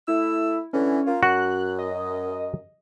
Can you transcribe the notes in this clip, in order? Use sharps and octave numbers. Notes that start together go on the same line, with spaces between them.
A3 E4 E6
D3 E3 C#4
A#3 F4
F#2 F#4 F#6
D#5